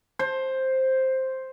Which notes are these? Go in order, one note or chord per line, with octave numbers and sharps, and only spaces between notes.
C5